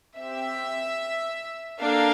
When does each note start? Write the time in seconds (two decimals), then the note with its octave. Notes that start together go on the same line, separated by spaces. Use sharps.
0.18 C4 G4 E5
1.81 A#3 D4 A4 F5